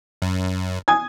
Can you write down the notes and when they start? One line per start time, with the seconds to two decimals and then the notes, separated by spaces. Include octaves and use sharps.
0.22 F#2
0.88 G#5 D#6 G#6